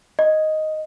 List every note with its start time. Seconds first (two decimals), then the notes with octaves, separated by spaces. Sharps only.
0.19 D#5